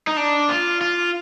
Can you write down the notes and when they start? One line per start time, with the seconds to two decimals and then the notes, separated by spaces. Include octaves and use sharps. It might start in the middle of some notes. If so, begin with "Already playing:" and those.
0.07 D#4
0.17 D4
0.49 F4
0.81 F4